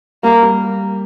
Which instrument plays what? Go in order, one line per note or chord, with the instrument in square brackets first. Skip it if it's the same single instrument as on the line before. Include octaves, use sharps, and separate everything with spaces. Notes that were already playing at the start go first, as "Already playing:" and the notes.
[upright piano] G3 [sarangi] A#3
[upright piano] G3